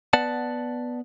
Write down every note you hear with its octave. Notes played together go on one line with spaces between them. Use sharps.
B3 B4 D5 F#5 A5